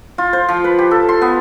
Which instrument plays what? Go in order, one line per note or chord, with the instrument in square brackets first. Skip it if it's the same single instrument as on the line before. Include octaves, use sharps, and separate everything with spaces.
[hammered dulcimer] F4
C5
F3
B4
G4
A4
C6
B3